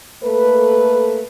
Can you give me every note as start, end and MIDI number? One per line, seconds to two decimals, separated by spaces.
0.24 1.23 57
0.24 1.23 58
0.24 1.23 69
0.24 1.23 71